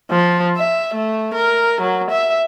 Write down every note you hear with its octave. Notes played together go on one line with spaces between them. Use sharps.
F3
E5
A3
A#4
F#3
E5